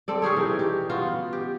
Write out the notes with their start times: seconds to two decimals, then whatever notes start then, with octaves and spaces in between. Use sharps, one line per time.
0.08 C4 A4 D5
0.22 C#4 G4 G#4 C#5
0.37 E3 D#4
0.59 G4
0.89 B3 F4 F#4
1.33 G4